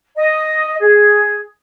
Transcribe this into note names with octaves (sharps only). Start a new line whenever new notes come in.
D#5
G#4